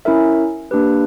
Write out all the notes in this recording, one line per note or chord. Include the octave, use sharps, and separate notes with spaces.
C#4 E4 A#4 E5
A#3 D4 G4 B4